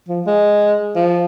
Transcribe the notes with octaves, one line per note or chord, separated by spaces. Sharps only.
F3
G#3
F3